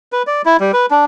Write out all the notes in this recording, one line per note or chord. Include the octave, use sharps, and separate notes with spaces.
B4
D5
E4
G3
B4
D4